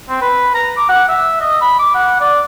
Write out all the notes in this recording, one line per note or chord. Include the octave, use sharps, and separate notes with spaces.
C4
B4
A#5
D6
F#5
E5
D#5
B5
D6
F#5
D5